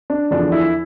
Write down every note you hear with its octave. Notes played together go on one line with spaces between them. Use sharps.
D4
E2 D3 F3 D4
E4